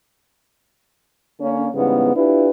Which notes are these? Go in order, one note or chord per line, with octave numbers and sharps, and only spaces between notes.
D3 A#3 C#4
E2 G#2 C#3 G3 B3
D4 E4 F4 G4 B4